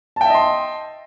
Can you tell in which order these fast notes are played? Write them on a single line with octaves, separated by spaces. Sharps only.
A5 G5 E5 D#5 C6